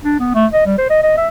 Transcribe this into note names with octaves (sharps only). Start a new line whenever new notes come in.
D4
B3
A3
D#5
G3
C5
D#5
D#5
E5